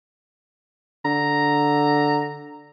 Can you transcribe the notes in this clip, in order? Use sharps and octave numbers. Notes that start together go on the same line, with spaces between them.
D3 A#5